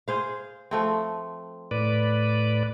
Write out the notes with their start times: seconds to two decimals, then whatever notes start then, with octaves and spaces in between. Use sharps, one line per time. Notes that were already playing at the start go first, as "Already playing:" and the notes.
0.08 G#4 C5 F5
0.71 F3 A3 C4
1.71 A2 B4 D5